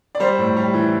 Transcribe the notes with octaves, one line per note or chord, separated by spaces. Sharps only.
D5
G3 C5
A2
G3
E3